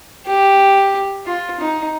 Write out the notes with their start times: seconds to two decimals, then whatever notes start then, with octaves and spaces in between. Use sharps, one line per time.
0.26 G4
1.26 F4
1.60 D#4